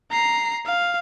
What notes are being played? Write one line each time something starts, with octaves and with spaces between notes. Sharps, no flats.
A#5 C7
F5